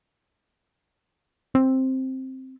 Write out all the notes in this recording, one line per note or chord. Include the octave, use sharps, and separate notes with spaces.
C4